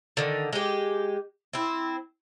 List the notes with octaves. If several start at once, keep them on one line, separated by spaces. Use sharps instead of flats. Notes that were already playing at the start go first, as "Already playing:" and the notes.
D3 D#3
G#3 G4
C4 E4